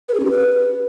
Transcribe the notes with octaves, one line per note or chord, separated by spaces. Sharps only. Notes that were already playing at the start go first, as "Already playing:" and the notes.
B4
G#4
C#4
G4
B4